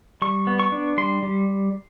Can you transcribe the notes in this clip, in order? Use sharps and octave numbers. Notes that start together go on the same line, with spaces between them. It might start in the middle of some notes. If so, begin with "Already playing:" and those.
G3 C#6
B3
C#6
D4
G3 C6
G3